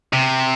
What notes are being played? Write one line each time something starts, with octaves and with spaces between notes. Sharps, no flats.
C3